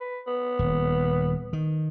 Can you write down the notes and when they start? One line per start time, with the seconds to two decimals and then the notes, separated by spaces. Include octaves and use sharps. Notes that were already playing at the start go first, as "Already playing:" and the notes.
0.01 B4
0.27 B3
0.59 D#1
1.53 D#3